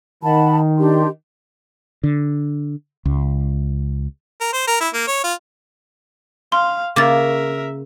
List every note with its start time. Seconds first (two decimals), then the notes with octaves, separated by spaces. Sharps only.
0.23 D#3 F#5 A5 B5
0.78 D4 G4 C6
2.03 D3
3.05 C#2
4.41 A#4
4.53 C5
4.67 A#4
4.80 E4
4.93 A#3
5.07 C#5
5.24 F4
6.52 F5 C6
6.96 C#3 A#3 A#4 C#5 E5 D6 A6